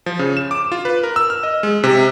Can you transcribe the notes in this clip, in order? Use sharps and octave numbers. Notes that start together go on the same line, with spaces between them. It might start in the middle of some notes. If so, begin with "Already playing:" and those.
F3
C#3
E7
D6
F4
B4
A#4
E6
F6
D#5
G#3
C3